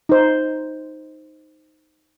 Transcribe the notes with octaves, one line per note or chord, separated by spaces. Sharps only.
D#4 C5